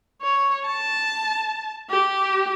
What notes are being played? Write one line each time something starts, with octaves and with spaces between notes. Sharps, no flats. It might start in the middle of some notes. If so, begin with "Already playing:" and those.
C#5
A5
G4